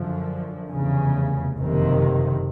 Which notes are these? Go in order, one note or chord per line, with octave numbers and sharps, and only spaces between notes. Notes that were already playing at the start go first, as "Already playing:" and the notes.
Already playing: F#2 D3 F3
F1 E2 C#3
F#1 F2 C3 D#3